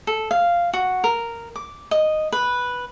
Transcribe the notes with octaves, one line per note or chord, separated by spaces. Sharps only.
A4
F5
F#4
A#4
D6
D#5
B4